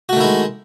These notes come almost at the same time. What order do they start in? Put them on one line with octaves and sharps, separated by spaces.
F#4 A3 D#3 E4 G#3